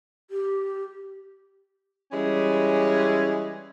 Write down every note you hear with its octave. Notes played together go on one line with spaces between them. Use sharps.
G4
E3 G3 G#3 C#4